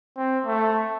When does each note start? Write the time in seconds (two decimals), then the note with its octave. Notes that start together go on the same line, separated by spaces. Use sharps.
0.17 C4
0.46 A3